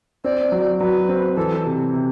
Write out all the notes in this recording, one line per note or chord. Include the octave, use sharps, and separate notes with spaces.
C4 D5
F#3
F#3 B4
C4
E3 A4
C3
C3